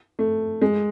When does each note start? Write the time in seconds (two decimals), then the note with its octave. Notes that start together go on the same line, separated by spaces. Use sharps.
0.19 A3
0.62 G#3